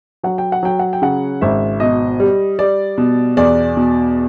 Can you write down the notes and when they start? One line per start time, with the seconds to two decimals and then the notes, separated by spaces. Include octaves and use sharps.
0.23 F#3 F#5
0.38 G5
0.52 F#5
0.63 F#3 G5
0.79 F#5
0.93 G5
1.02 C#3 F#5
1.41 G#1 E5
1.80 B2 D#5
2.20 G3
2.59 G3 D5
2.98 B2
3.37 E2 D5
3.77 B2